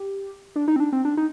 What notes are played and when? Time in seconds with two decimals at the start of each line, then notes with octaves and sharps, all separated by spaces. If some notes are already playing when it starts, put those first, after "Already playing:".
Already playing: G4
0.56 D4
0.68 D#4
0.76 C4
0.80 D4
0.93 C4
1.05 D4
1.17 D#4